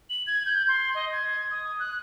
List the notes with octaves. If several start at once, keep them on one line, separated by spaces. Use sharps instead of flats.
F#7
G#6
G6
C6
D#5
G#6
D#6
F#6